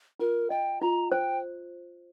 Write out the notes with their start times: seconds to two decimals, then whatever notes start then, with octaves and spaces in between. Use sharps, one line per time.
0.19 F4 A#4
0.50 D#5 G5
0.81 F4 A#5
1.11 C5 G5